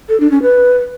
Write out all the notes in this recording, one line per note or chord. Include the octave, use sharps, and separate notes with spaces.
A4
D4
C#4
B4